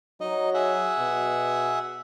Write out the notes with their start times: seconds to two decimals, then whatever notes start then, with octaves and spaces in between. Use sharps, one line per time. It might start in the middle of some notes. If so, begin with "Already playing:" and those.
0.21 F#3 D#4 D#5
0.54 G#4 E5 F#5
0.98 B2